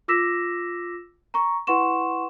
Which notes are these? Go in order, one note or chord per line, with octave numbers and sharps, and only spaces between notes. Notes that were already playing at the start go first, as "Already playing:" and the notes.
F4 D6 E6 A#6 B6 E7
A#5 C#6
E4 B4 F#5 C6 C#6 E7